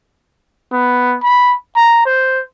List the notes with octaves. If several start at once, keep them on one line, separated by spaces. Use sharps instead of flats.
B3
B5
A#5
C5